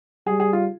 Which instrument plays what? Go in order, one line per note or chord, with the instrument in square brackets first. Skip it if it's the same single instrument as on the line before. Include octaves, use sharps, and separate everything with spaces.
[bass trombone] G3 [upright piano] G#4
[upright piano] G#4
F4